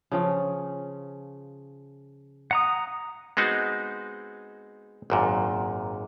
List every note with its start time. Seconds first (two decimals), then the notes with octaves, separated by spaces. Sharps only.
0.11 C#3 F3 C#4
2.51 F#5 A#5 D#6
3.37 G#3 B3 C4 D#4 F#4
5.10 G#1 F#2 A#2